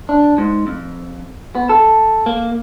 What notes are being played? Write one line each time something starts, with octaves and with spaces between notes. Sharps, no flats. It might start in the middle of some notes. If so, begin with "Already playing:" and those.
D4
G#2
F2
B3
A4
A#3